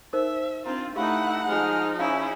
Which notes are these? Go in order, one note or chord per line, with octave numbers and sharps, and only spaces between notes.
D#4 A#4 C5 E5
C4 D4 F4 A#5
A3 D#4 E4 G4 F5 F#5 B5
F3 G#3 D#4 F6
C#4 E4 G#4 F5